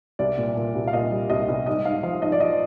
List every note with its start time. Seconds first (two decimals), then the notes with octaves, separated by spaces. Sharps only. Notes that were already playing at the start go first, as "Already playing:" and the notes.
0.19 C2 D5
0.38 A#2
0.57 A#2
0.75 C2
0.87 F5
0.93 A#2 D#5
1.12 G3
1.30 C2 D#5
1.48 C2
1.66 G#2 D#5
1.85 G#2 F5
2.03 F3 F5
2.22 G#2 D#5
2.32 D5
2.40 F3 D#5